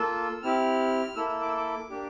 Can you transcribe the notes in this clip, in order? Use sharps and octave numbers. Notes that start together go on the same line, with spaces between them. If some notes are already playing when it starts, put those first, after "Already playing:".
Already playing: A#3 F4 A4 E6
C4 E4 G4 F6
A#3 E4 A4 E6
E6
D6
E6
D6
A#3 D4 G4